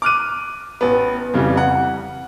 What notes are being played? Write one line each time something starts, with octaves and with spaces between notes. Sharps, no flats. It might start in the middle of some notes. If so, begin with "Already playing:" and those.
D6 F6 F#6 D#7
A1 B3
F2 C#3 E3 G3
F#5